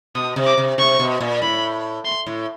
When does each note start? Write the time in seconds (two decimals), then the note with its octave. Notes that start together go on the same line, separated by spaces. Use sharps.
0.15 B2 D#6
0.36 C3
0.46 D6
0.58 C3
0.78 C3 C#6
0.99 B2
1.20 A#2
1.42 A2 B5
2.05 C6
2.26 A2